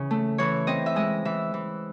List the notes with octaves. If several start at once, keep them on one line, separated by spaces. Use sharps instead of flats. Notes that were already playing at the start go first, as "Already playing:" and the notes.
Already playing: C#3 E3
A3
E3 C#5
C4 D#5
E5
G#3 D#5
E3 E5
E3